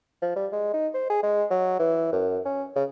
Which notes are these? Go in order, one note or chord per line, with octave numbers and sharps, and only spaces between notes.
F3
G3
G#3
D#4
C5
G#4
G#3
F#3
E3
F#2
C#4
C#3